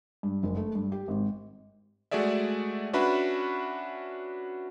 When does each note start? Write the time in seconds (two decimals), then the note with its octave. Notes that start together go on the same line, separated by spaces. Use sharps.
0.23 G2
0.43 F#1
0.57 A3
0.75 G2
0.92 G4
1.08 G#1
2.11 G#3 A3 F#4 G#4 D5 E5
2.93 C#4 D4 F#4 B4 E5 B5